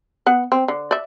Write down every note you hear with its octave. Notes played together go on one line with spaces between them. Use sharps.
B3 F#5
C4
D3
D5 E5